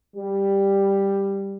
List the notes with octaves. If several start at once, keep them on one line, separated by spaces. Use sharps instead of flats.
G3